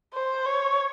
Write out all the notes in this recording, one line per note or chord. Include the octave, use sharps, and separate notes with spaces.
C5
C#5